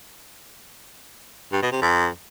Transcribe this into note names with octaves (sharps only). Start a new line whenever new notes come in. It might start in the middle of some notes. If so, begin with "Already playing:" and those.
G2
B2
C3
F2